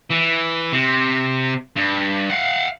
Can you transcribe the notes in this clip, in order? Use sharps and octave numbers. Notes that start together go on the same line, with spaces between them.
E3
C3
G2
F5 F#5